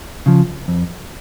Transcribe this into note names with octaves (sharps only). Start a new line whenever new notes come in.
C#3 F3
F2